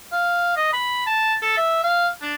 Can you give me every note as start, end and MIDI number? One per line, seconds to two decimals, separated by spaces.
0.12 0.53 77
0.56 0.72 75
0.73 1.04 83
1.06 1.34 81
1.42 1.53 69
1.57 1.78 76
1.84 2.08 77
2.22 2.35 62